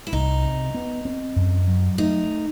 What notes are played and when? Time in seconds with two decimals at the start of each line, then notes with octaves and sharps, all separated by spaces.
0.07 E4
0.13 C2 D#4
0.44 C3
0.74 B3
1.05 C4
1.36 F#2
1.68 F#3
1.98 A3 D#4